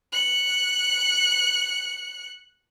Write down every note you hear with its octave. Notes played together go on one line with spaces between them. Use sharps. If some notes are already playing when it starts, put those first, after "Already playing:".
F#6 C#7